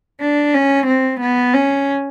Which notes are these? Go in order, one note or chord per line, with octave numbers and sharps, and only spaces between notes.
D4
C#4
C4
B3
C#4